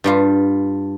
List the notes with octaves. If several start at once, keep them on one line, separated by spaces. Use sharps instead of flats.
G2 G3 F4